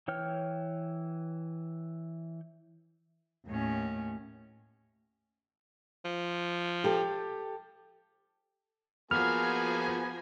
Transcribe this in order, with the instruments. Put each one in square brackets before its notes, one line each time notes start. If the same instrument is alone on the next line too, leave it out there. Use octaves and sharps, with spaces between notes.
[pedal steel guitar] E3 C#5 G5 F6
[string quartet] D#2 A2 C#4
[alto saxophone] F3
[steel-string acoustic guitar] G4 A4
[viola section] F3 G#5 [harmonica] A#3 F#4 G#4 [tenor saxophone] B3 [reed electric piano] F6